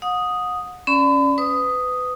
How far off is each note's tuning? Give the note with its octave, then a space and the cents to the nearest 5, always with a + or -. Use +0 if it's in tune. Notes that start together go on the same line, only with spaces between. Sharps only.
F#5 -35 D#6 +0
C#4 +0 D5 -5 B5 +40
B4 +30 D#6 +0